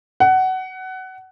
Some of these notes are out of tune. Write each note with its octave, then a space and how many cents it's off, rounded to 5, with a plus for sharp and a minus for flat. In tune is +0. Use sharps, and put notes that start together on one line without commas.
F#5 +20